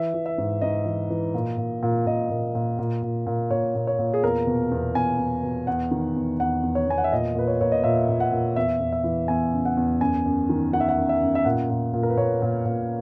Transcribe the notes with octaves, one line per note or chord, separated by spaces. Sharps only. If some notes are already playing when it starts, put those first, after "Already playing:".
Already playing: E3 E5
E3
E5
G#2
G#2 D#5
E3
E3
A#2
A#2
A#2
A#2 D#5
A#2
A#2
A#2
A#2
A#2
A#2 C#5
A#2
C#5
A#2
G#4
E2 A#4
B2
E2
E2 G#5
E2
B2
E2 F#5
D#3
E2
E2 F#5
E2
C#5
E2 G#5
F#5
E5
A#2 D#5
A#2 B4
C#5
A#2 C#5
D#5
A#2 E5
A#2
F#5
A#2
E2 E5
E2
E5
E3
E2 G#5
C#3
F#5
E2
F#2 G#5
F#2
D#3
D#3 F#5
E5
F#5
F#2
E5
F#2
E5
A#2 F#5
A#2
A#2
A#4
B4
A#2 C#5
A#2
A#2